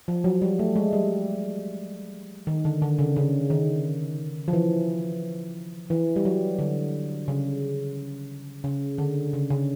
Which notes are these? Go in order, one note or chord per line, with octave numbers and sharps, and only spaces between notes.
F3
F#3
G3
A3
G#3
G3
D#3
D3
D3
C#3
C#3
D#3
F3
E3
E3
G3
F#3
D3
C#3
C#3
D3
C#3
C#3